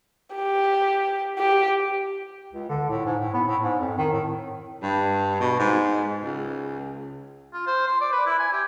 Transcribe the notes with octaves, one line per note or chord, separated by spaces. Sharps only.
G4
G4
C#2
D3
A2
G#2
A2
B3
A2
G#2
F2
D#3
A2
G2
B2
G#2
C#2
F4
C5
C6
D5
B4
E4
G#5
G4